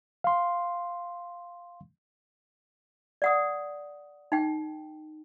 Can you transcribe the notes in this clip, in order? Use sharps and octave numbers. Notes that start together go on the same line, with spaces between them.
F5 C6
D5 F#5 D#6
D#4 G5